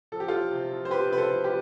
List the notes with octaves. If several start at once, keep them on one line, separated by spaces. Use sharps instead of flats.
F3 A4
G4
F3 F4 A4
C3
F3
C5
F3 G4 B4
C3 B4
A4 C5
F3
G4 B4